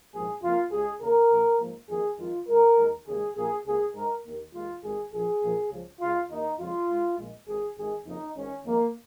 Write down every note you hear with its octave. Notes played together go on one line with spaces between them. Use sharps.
A#1 G#2 F3 A#3 G#4
F2 C#3 A#3 F4
C#2 C#3 G#3 G#4
D#2 C#3 A#3 A#4
A#1 A#2 A#3
G#2 F3 A#3
F2 D#3 A#3 G#4
F2 D#3 G#3 F4
G#1 G#2 G#3 A#4
D#2 D#3 G#3
D#2 C#3 G#3 G#4
A#1 A#2 A#3 G#4
C#2 C#3 A#3 G#4
G#2 G#3 A#4
D#2 D#3 A#3
D#2 D#3 G#3 F4
G#1 G#2 D#3 G#3 G#4
A#1 A#2 F3 G#4
A#1 A#2 F3 A#3
C#2 C#3 F3
C#2 C#3 G#3 F4
D#2 D#3 A#3 D#4
F2 C#3 G#3 F4
G#2 G#3
A#1 A#2 G#3
G#1 G#2 D#3 G#4
G#1 G#2 D#3 G#3 G#4
F2 C#3 A#3 D#4
G#1 G#2 D#3 C#4
F2 D#3 G#3 A#3